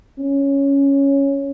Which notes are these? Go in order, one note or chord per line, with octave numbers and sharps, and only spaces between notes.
C#4